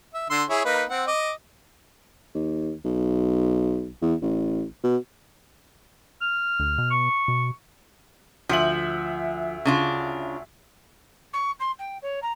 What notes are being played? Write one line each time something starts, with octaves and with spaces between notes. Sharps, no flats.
E5
D3 C6 E6
E4 G#4 C#5
A#3 D#4 B4
C4 F#5
D#5 D6
D#2
B1
E2
A1
B2
F6
D2
B2
C#6
B2
D2 F3 E5 F#7
C#3 D4 F4
C#6
C6
G5
C#5
A#5